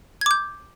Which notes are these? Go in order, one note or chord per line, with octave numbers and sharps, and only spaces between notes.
D6 G6 G#6